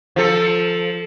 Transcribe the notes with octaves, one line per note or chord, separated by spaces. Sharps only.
F3 A4